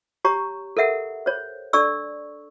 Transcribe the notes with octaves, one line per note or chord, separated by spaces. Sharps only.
G4 C#5 A#5 C#6
A4 A#4 E5 F#5
C5 C#5
D4 A4 D5 C#6 E6